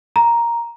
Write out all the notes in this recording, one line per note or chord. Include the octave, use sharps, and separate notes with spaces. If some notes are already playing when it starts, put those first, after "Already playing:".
A#5